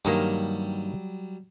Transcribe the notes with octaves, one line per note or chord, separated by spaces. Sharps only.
G2 D#3 F#3 G3 A#3